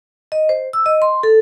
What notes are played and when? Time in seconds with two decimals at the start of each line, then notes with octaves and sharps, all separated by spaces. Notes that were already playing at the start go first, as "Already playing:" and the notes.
0.32 D#5
0.49 C5
0.73 E6
0.86 D#5
1.02 C6
1.23 A4